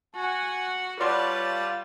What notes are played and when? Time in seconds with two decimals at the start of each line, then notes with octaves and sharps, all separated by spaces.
0.16 F#4 F#5 G#5
1.00 G3 F4 F#4 B4 C#5 D5 A5 C6